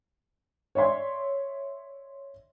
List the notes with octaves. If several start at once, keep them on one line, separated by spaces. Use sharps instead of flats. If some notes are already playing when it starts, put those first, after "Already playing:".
C#5 D5 E5 C6 G#6